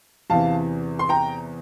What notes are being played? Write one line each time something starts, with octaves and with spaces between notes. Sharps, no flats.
E2 C3 E3 F5 A5
C6
G5 A#5